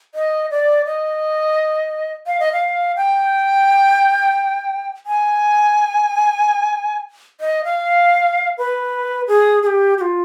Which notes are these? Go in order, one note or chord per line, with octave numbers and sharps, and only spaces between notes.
D#5
D5
D#5
F5
D#5
F5
G5
G#5
D#5
F5
B4
G#4
G#4
G4
G4
F4